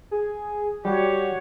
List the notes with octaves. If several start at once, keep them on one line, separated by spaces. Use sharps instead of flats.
G#4
G3 F#4 G4 C#5